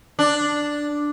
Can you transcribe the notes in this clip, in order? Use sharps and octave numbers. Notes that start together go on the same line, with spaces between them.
D4